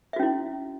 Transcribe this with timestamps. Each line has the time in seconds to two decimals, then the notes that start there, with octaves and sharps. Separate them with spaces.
0.13 E5
0.16 F#4
0.19 C#4
0.22 E4